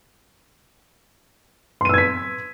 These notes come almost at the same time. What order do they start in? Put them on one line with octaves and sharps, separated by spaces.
C6 D#7 E6 G#6 B6